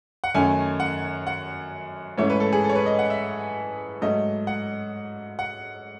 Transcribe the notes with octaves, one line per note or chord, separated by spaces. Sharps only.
F#5
F#2 D#3 A3 C#4 G#5
F#5
F#5
G#2 E3 A3 C#4 C#5
B4
A4
G#4
A4
C#5
B4
D#5
F#5
E5
G#2 F#3 A3 D#5
F#5
F#5